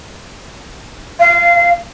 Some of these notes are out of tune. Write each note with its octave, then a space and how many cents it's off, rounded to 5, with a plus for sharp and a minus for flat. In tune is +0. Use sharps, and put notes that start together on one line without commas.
F5 -25